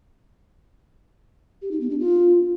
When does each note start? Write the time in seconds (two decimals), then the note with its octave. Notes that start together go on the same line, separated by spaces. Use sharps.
1.62 G4
1.71 D#4
1.81 B3
1.90 D4
1.99 F4